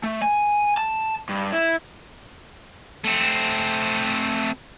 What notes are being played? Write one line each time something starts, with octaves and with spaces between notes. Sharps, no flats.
A3
G#5
A5
G2
E4
A3 C4